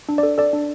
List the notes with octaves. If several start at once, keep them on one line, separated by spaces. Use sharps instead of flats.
D4
D5
A4
A4 D5
D4